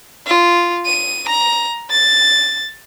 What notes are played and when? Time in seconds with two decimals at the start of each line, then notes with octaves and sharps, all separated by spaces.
0.27 F4
0.86 D#7
1.29 A#5
1.91 A6